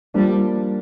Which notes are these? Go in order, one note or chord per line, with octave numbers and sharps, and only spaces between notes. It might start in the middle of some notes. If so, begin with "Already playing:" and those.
F3 G3 A#3 D4